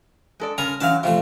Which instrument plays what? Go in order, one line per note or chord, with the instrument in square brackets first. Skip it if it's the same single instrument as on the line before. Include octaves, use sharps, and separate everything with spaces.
[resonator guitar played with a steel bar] G#3 A4 D5
[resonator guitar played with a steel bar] C#3 [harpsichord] A#4 G#5 A#5
[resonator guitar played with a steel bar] E3 F#3 C#4 [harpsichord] F5 A5
[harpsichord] C3 F3 A3 [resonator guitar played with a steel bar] E3